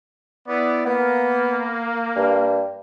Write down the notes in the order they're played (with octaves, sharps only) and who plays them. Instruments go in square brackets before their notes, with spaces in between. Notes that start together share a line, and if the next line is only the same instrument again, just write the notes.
[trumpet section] B3 E4 D5
[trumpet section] A#3 [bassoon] B3
[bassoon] G2